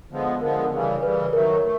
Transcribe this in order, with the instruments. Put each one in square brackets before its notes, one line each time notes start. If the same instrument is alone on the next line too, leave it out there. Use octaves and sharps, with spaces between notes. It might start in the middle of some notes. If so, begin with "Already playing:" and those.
[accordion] D3 F3 G#3 B3
[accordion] D3 F3 G#3 B3 [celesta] A#4
[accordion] C#3 E3 G3
[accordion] C#3 E3 G3 [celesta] B4
[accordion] D#3 F#3 A3 [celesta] A#4
[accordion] A3